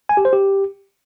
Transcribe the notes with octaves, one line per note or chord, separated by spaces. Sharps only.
G#5
G4
C5
G4